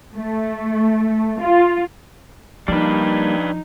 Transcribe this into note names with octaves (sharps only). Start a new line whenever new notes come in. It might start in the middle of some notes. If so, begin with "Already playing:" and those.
A3
F4
F3 G3 A#3 D4 D#4 B4